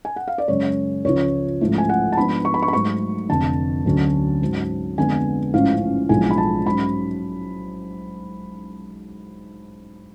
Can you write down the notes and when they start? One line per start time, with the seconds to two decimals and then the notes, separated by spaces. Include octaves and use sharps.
0.05 G#5
0.16 F#5
0.28 F5
0.38 D5
0.48 F#2 C#3 G#3 C#4 C#5
1.05 C#2 C#3 F3 C#5
1.61 A1 G#2 F3 A3
1.78 G#5
1.89 F#5
2.13 A5
2.17 G#2 F3 B3 D4 B5
2.45 C#6
2.54 B5
2.63 C#6
2.68 B5
2.73 G#2 F#3 A3 C#6
3.29 F1 F2 D3 A5
3.85 D2 D3 F#3 C#4
4.42 G#2 F#3 C#4
4.97 F2 D3 G#3 B3 G#5
5.53 A1 G#2 F3 A3 C#4 F5
6.09 B1 A2 F3 G#3 D4 G#5
6.31 B5
6.38 A5
6.66 G#2 F#3 C#4 B5